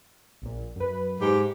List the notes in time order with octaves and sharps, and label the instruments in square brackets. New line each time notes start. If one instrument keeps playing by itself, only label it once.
[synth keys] A#1 A#2
F#2 B4
[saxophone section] G#2 G4